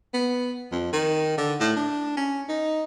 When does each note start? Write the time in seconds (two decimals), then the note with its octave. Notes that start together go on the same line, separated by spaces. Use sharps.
0.14 B3
0.72 F2
0.93 D#3
1.38 D3
1.60 A2
1.76 D4
2.17 C#4
2.49 D#4